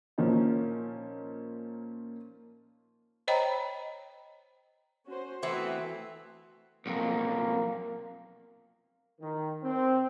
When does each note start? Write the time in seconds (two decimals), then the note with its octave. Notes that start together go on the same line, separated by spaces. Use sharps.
0.18 A#2 F3 A#3 C#4 D#4
3.28 C5 C#5 D#5 G5 A#5 B5
5.06 C#4 F#4 C5
5.43 E3 A3 B3 C4 F#4
6.86 B1 F2 A#3
9.20 D#3
9.63 C4